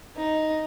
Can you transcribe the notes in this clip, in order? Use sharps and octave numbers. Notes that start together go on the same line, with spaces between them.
D#4